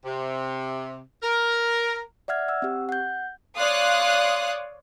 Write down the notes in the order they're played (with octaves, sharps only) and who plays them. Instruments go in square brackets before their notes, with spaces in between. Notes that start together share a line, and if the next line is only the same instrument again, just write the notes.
[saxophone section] C3
A#4
[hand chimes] D5 E5 F#5 F6 G#6
F#5 E6
C4 G4
F#5 G6
[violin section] C#5 D5 F5 C6 D#6 F#6